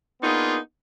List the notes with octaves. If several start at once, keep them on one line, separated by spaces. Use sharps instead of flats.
A#3 B3 D4 D#4 F4 G#4